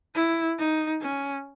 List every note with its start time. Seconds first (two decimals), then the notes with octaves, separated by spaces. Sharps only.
0.15 E4
0.59 D#4
1.01 C#4